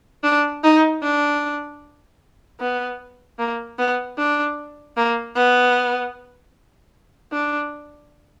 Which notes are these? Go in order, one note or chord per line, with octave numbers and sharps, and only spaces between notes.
D4
D#4
D4
B3
A#3
B3
D4
A#3
B3
D4